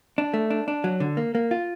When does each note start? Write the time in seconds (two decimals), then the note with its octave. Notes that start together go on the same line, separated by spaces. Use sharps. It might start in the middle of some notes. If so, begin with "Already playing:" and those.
0.18 D4
0.34 A3
0.50 D4
0.68 D4
0.84 F#3
1.00 D3
1.17 A#3
1.35 A#3
1.51 F4